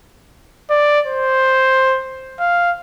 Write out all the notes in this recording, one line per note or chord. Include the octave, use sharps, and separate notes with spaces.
D5
C5
F5